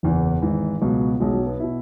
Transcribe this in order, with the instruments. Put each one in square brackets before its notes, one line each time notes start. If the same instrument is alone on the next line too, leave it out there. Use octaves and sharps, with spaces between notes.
[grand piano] F#1 E2 E3
G#1 G#2 E3
C#2 B2 F#3
B1 B2 G#3
F#3
B3
B2 E4